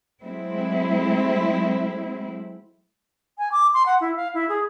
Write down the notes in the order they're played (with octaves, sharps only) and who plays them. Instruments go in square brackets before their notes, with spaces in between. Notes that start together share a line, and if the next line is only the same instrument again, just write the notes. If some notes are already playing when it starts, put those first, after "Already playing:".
[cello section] F#3 G#3 A3 C4 E4
[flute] G#5
D6
C6
F#5
E4
F5
E4
G#4